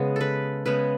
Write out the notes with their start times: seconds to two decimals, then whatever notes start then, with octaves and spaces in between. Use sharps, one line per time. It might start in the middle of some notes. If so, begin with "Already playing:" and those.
Already playing: C#3 G#3 B3 F#5
0.16 A4 B4
0.66 C#3 G#3 B3 B4